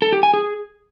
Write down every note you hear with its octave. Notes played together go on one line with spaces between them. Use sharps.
A4
G4
G#5
G#4